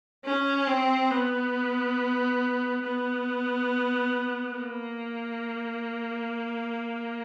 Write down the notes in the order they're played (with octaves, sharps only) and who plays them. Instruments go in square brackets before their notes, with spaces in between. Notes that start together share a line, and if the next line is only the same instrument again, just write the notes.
[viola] C#4
C4
B3
B3
A#3